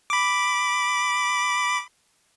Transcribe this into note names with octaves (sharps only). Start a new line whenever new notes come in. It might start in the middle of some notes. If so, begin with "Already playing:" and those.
B5 D6